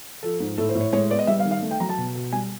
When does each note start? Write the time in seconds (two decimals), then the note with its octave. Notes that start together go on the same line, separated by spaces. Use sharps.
0.23 F3 A4
0.40 G#2
0.58 A2 A4
0.69 C5
0.75 A2
0.81 C#5
0.93 G#3 C#5
1.10 B3 D5
1.19 D#5
1.27 G3 E5
1.40 F5
1.45 D#3
1.51 F5
1.62 A3
1.71 G5
1.80 F#3 A#5
1.89 A5
1.98 B2
2.15 B2
2.33 G3 G#5